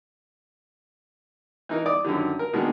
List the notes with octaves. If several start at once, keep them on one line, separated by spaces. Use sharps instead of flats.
E3 D#4 A#4
D5 D6 D#6
F#2 D3 D#3
A#4
B2 D#3 G#3 A#3 D4